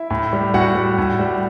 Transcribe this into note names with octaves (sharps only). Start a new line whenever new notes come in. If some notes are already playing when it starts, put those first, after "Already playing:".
Already playing: E4 E5
A2
G3
A2 F#4 F#5
G3
A2
G3